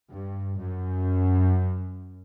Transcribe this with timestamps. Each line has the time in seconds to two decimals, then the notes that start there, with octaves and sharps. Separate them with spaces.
0.11 G2
0.59 F#2